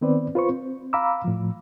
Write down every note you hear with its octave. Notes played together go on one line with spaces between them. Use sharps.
D#3 B3 C4 B4 D5
F4 B4 C5 C#6
C4
F5 A#5 B5 D6 E6
A2 F3